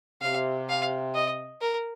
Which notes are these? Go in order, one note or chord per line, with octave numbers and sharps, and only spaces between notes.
C3 F5
F5
D#5
A#4